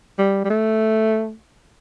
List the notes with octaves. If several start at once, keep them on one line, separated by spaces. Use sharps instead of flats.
G3
G3
A3